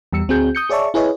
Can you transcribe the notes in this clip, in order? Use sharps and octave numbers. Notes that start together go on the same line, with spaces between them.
E2 G3 E6 C#7
D2 C4 F#4 G#4 G6
D#6 G6 C#7
G#4 C#5 D5 E5 A5 C#6
E4 G#4 B4 C#5 D#5